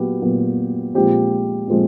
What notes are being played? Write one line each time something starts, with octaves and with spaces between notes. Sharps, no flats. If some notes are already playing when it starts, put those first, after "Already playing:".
Already playing: A#2 F#3 B3 G4
A#2 F#3 B3
A#2 F3 G#3 C4 G4
A#2 F3 G#3 C4